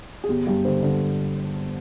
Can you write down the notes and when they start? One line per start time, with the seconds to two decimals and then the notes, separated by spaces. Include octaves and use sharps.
0.24 G#4
0.29 G1 G4
0.47 G2 G4
0.65 D3 C5
0.83 D3